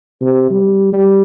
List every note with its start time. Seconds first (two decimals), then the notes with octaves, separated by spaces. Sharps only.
0.21 C3
0.50 G3
0.93 G3